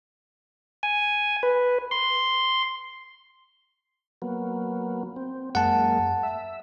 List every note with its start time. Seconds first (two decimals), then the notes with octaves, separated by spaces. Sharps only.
0.83 G#5
1.43 B4
1.91 C6
4.22 F#3 A#3 B3
5.16 C4
5.55 F#2 G#3 A#3 F#5 A5
6.23 E5